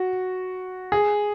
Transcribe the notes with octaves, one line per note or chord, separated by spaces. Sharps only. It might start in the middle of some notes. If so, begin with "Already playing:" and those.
Already playing: F#4
G#4